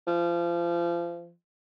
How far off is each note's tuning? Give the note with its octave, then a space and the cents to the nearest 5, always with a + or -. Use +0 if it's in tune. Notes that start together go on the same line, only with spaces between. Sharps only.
F3 -30